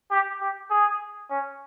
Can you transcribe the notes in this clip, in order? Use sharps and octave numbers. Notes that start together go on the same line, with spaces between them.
G4
G4
G#4
C#4